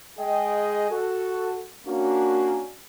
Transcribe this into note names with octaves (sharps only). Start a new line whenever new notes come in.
G#3 G#4 D#5 G5
F#4 A4
A#3 C#4 D4 F#4